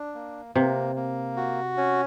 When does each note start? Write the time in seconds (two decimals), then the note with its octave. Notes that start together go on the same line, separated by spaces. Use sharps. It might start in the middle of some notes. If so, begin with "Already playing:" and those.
Already playing: D4
0.14 A#3
0.55 C3 A#3
0.96 A#3
1.36 F#4
1.77 C#4